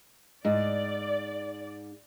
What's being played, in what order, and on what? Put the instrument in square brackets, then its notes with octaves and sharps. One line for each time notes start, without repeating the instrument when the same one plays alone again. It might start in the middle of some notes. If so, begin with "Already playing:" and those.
[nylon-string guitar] G#2 [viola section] D5 [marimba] D#5